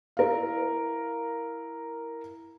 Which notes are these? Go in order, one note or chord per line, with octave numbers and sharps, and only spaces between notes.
E4 A#4 F5